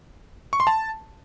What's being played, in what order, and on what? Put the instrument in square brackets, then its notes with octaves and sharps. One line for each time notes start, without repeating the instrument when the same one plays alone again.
[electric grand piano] C#6
C6
A5